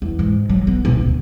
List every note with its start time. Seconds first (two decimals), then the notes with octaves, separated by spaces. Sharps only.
0.02 E2
0.19 G#2
0.49 F#3
0.67 B3
0.85 D#1
0.98 D2